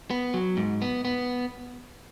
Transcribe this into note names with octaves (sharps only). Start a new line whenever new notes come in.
B3
F#3
G#2
B3
B3